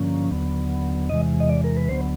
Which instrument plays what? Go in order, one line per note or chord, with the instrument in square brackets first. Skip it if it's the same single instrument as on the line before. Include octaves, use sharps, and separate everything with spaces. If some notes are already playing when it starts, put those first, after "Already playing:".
Already playing: [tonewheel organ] G2 D3 F3 A#3 C#4
D#2 D3 F#3 B3
E2 C3 E3 G#3 D#5
D#5
D5
A#4
B4
D2 D3 F#3 B3 C5